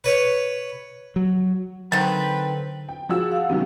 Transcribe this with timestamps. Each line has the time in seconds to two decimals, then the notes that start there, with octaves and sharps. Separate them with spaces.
0.04 B4 C#5
1.16 F#3
1.92 D3 D#3 F#3 C4 B4
2.89 G5
3.09 F3 F#4 G#4 E6
3.32 F5 F#5
3.49 C3 D#3 F#3 B3 C#4